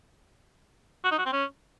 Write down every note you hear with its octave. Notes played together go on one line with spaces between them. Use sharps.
F#4
D#4
F#4
C4
C#4